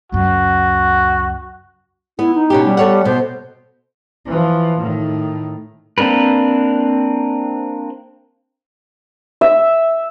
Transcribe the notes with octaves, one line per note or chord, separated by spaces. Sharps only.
C#2 F#2 F#4
B3 E4
D#4
B2 C#4 G4
G3
A4 C#5 F#5
B2 C5
E3 F3
A2 D#3
A#3 C4 D4 A#4 B4
E5